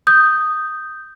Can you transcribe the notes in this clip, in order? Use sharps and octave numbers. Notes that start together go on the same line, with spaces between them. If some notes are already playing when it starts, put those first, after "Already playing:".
D#6 G6